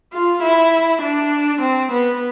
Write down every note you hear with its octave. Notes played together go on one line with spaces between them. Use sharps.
F4
E4
D4
C4
B3